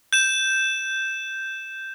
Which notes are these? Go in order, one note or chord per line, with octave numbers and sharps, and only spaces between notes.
G6 E7